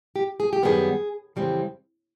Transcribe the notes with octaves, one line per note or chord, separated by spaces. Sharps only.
G4
G#4
G4
F#2 D#3 G3 B3 G#4
F2 C#3 E3 G3 C4